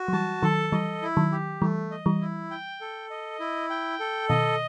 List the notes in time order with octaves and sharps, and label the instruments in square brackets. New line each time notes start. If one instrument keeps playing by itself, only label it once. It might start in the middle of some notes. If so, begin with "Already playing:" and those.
Already playing: [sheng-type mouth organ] F#4
[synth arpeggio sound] F#3
[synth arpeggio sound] E3 G3 [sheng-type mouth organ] A5
[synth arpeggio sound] D#3 F#3 [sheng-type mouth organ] A4
[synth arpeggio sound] E3 G3 [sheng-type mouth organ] D#5
[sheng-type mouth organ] E4
[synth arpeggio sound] D#3 F#3
[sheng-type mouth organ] G4
[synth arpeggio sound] E3 G3 [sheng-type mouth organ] A3
[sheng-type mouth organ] D#5
[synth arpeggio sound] E3 G3
[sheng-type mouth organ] E4
G5
A4
D#5
E4
G5
A4
[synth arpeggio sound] B2 D#3 [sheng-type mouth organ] D#5